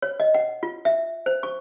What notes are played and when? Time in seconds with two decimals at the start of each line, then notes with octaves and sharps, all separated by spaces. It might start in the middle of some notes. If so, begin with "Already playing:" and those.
0.02 C#5
0.20 D#5
0.34 F#5
0.63 F4
0.85 E5
1.26 C5
1.43 C#6